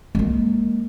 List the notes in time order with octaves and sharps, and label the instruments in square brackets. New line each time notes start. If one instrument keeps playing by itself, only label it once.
[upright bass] G#3 A#3